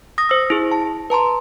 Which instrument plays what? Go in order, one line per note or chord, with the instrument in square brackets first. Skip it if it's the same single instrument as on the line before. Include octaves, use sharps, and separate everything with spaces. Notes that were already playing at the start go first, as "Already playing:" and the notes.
[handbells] D#6 A#6
C5 E6
E4 G#4
A5
B4 A5 A#5 C6